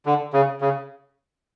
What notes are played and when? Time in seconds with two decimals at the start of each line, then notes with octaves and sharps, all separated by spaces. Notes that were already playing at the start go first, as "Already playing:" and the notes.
0.06 D3
0.33 C#3
0.61 C#3